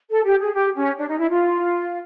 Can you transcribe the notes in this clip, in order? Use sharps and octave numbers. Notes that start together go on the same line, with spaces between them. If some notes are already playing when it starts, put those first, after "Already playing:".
A4
G4
G#4
G4
C#4
D4
D#4
E4
F4